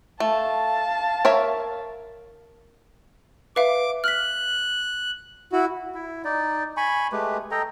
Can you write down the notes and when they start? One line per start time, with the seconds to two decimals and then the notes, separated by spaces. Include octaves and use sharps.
0.20 A3 F5 A5
1.25 A#4 C#5 E5
3.56 B4 E5 F5 D6
4.04 F6 F#6 B6
5.52 E4 F#4
5.94 E4
6.24 D#4 D5
6.77 G#5 B5 C#6
7.12 G#3 A3 G4 B4
7.51 A4 D#5 G5 A#5